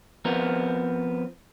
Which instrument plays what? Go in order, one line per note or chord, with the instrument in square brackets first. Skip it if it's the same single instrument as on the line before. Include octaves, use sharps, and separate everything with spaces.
[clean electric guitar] F3 B3 C4 A#4